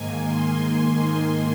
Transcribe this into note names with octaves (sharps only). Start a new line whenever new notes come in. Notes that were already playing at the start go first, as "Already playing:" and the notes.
Already playing: G#2 D#3 A#3 G#5
C6